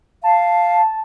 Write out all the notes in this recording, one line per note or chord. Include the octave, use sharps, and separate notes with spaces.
F5 A5